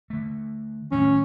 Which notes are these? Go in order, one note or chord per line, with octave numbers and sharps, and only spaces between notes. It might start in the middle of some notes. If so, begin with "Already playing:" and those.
D3 A3
A2 D#3 F#3 C#4